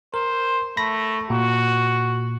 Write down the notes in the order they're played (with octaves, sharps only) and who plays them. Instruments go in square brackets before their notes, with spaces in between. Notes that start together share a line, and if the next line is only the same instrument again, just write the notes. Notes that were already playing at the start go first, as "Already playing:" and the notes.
[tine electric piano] A#4 [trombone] C5
[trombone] A3 [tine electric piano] B5 A#6
[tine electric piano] A#2 [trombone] F#4